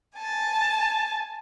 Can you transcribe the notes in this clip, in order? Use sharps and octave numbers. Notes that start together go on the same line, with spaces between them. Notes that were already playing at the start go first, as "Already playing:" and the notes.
G#5 A5